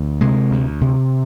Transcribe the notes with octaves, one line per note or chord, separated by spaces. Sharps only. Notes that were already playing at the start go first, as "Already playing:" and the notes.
Already playing: D2
C3 G#3
D2
C3